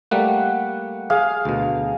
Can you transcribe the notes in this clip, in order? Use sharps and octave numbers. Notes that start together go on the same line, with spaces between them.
G3 A3 A#3 F#5
G#4 F5
D2 B2